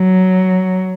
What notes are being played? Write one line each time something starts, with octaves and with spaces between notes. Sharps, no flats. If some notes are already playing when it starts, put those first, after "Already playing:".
Already playing: F#3